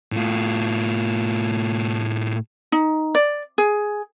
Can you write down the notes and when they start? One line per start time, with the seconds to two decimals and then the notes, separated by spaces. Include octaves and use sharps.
0.12 A2 F4
2.72 D#4
3.15 D5
3.58 G#4